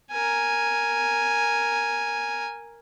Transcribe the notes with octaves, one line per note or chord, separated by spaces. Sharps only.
A#4 G#5